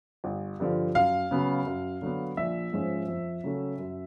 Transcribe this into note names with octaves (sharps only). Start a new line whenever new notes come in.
G1
G2 D3 F3
F#2 F5
C#3 F#3 B3
F#2
D3 F#3 B3
A#1 E5
G#2 F3 G#3 C#4
F2
C#3 F#3 A3 C#4
F#2